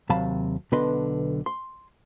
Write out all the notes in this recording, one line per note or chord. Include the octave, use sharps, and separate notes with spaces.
D#2 C3 F#3 F5 A5 B5
B1 D3 B3 B4 D#5 C6
C6